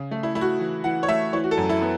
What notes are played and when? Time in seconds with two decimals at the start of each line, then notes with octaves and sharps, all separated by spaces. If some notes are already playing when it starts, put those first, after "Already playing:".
Already playing: C#3
0.11 A3
0.23 E4
0.35 A3 E4
0.41 F#4
0.60 E3
0.84 E3 F#5
1.03 C#5
1.08 A3 E5
1.33 E3 C#5
1.44 F#4
1.51 A4
1.57 F#2
1.69 E4
1.82 B3